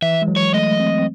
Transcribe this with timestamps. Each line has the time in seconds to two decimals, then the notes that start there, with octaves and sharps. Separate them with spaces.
0.02 E3 E5
0.22 G#3
0.28 F#3
0.36 C#5
0.54 A3 D#5
0.80 C4
0.99 C4